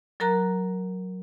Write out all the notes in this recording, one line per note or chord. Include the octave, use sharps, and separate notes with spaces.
F#3 A#4 A#5 F#6